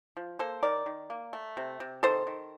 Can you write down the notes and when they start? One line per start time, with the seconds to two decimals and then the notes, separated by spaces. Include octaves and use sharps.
0.17 F3
0.39 A#3 A4 C5
0.63 D#3 A#4 D5
0.86 D#3
1.10 A#3
1.33 A3
1.57 C3
1.80 C3
2.03 D#3 A4 C5
2.27 D#3